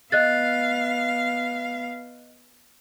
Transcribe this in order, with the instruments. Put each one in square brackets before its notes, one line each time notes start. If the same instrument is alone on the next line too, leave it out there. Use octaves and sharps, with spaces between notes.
[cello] B3 F5 [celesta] D#5 F#6 A6